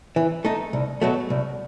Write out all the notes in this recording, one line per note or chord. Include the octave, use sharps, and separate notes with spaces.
E3
A3 D#4
C2
B2 F#3 A3
C2